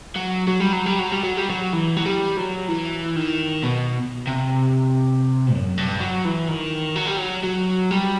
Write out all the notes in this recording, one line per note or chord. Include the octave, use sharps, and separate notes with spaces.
F#3
F#3
G3
F#3
G3
F#3
G3
F#3
G3
F#3
E3
F#3
G3
F#3
E3
D#3
B2
C3
F#2
G2
F#3
E3
D#3
F#3
G3
F#3
F#3
G3